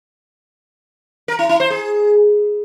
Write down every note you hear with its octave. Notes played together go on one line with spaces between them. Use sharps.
A#4
E4
E4
C5
G#4